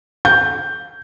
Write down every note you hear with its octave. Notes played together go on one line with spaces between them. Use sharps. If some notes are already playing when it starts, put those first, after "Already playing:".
G6